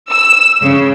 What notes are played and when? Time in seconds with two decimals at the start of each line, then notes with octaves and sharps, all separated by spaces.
0.11 E6
0.61 C#3